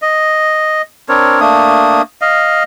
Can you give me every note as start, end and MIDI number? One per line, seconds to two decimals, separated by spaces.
0.02 0.82 75
1.09 1.40 60
1.09 1.40 62
1.09 1.40 70
1.09 1.40 73
1.40 2.02 57
1.40 2.02 58
1.40 2.02 62
1.40 2.02 87
2.21 2.63 75
2.21 2.63 77